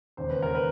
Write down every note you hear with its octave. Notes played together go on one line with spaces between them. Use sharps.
E1 D#2 C#3 C5
B4
A#4
B4